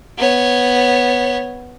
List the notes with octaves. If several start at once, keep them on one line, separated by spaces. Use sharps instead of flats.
B3 C#5